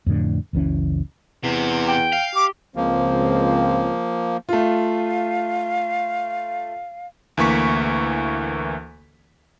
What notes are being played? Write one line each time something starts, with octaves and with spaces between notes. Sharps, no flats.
F2 A2 D3
F#1 C#2 E3 C#4
E2 C3
G5
F5
G4 D6
C#2 F3 A#3 C4
A3 F4 F5
D2 E3 A#3 C#6 B6